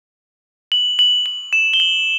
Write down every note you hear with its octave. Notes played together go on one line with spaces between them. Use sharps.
F#7
F#7
F#7
E7
G7
F#7